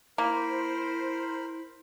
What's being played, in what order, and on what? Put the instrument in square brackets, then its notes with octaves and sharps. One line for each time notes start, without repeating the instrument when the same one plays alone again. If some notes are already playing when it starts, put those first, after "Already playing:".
[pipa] A#3 [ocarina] E4 [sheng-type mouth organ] A#4 B5 [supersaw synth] C5